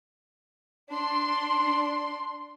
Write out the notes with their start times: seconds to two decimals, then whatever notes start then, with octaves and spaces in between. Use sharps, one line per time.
0.91 D4 C6